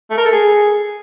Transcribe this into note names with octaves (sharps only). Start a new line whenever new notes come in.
A3
A#4
A4
G#4